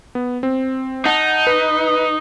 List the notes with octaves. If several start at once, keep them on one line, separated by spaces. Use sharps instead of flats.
B3
C4
D#4 F#5 A5
B4